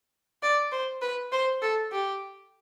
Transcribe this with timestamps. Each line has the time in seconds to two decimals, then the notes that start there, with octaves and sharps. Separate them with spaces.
0.43 D5
0.72 C5
1.02 B4
1.32 C5
1.62 A4
1.92 G4